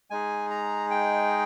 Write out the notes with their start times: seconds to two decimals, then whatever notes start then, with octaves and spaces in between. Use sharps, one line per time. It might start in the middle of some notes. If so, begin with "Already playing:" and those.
0.10 G#3 D#4 G#4 G#5
0.50 A#5
0.91 G5